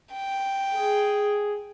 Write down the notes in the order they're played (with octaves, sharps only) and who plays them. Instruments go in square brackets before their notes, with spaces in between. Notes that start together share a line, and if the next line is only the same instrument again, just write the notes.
[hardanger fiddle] G5
[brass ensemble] G#4